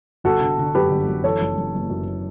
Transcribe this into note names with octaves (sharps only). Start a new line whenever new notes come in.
G1 F#4 A4
D3
D3
F#2 G4 B4
G1
F#2
E3 A4 C#5
F#1
F#1
F#1
F#2